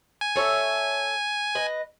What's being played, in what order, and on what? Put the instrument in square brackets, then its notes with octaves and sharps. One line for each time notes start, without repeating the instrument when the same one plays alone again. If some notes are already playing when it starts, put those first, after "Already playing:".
[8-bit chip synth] G#5
[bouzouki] A4 C#5 E5
B4 D#5